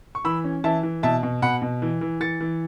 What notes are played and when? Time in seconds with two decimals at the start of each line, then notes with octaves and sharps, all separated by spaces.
0.15 C#6
0.25 E3 B5 E6
0.44 C#4
0.64 E3 E5 A5
0.83 E3
1.03 B2 E5 A5
1.23 B2
1.42 B2 F#5 B5
1.62 B2
1.82 E3
2.01 E3
2.20 E3 A6 C#7
2.41 E3